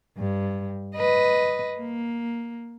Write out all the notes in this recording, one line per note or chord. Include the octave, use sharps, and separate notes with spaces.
G2
B4 D#5
A#3